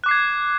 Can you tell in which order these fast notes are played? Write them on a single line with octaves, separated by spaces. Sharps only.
F#6 D6 C7 G#6